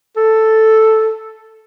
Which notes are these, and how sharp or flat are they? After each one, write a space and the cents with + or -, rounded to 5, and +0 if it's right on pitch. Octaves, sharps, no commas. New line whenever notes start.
A4 +0